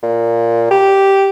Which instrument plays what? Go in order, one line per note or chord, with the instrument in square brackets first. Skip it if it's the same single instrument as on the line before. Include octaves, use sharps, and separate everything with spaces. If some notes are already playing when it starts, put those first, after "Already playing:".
[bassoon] A#2
G4